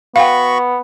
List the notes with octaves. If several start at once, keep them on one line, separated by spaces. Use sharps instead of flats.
B3 F#4 F5 G5 B5 C#6